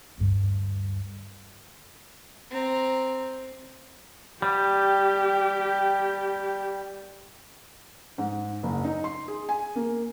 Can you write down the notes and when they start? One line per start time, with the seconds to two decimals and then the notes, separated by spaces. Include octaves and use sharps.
0.18 D2 G2
2.51 C4 A#5
4.42 G3 G4
8.18 G#2
8.63 F#1
8.84 D#4
9.04 C6
9.28 G#4
9.49 G#5
9.76 A#3